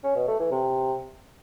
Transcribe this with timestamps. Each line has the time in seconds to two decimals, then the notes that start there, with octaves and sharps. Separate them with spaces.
0.04 C#4
0.16 B2
0.28 A3
0.40 E3
0.52 C3